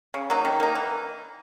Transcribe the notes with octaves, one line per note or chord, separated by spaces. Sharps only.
C#3
F#3 A#3 D#4
D#3
A#3 D#4
E3